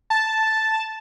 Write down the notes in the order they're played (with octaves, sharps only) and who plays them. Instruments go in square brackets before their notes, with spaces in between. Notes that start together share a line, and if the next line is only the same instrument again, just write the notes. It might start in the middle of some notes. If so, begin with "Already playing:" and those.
[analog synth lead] A5